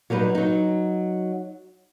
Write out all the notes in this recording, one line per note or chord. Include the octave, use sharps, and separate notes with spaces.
F#3 G3 D#4 B4
F#3 D#4